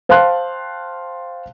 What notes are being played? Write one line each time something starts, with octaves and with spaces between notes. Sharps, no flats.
C5 F5 G5 A5 C6 F#6